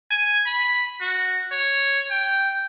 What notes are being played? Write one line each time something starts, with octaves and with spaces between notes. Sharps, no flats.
G#5
B5
F#4
C#5
G5